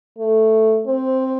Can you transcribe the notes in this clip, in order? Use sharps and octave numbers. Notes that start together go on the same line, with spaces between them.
A3
C4